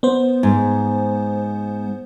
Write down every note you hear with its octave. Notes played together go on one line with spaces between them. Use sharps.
B3 C5
G#2